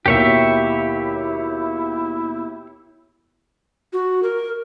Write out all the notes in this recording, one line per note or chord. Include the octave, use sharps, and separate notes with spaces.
D#2 B2 E4 G4 C#5 E5
F#4
A#4